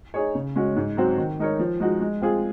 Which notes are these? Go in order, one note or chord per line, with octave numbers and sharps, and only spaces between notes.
D#4 G#4 C#5
C#3
G#3 C#4 F#4
G#2
F#3 C4 F#4
D#3
G#3 D#4 A#4 C#5
F3
G#3 D#4 F#4
G#3
C4 F4 G#4